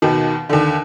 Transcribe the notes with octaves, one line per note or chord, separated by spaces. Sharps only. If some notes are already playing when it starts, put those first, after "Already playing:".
D#2 B2 D#3
D#2 D3